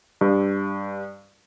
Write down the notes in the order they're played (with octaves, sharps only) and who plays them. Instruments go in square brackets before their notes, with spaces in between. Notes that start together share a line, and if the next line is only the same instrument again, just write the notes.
[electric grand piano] G2